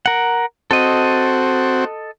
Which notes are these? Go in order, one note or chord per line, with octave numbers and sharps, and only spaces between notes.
A#4 F#5
C4 F#4 A4 D#5